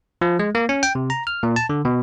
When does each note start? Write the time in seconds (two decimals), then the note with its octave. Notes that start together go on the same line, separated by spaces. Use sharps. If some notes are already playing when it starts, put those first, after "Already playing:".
0.21 F3
0.39 G#3
0.55 A#3
0.69 C#4
0.83 G5
0.95 C3
1.10 A#5
1.27 F6
1.43 A#2
1.56 A5
1.69 D3
1.85 B2